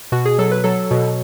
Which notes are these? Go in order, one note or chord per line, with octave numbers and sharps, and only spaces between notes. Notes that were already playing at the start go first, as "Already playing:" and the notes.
B2 F#4
G#4
F#3 A4
B4
F#3 A4
B2